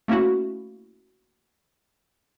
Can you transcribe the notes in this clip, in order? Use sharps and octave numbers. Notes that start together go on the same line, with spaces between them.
A3 A#3 C#4 E4 F#4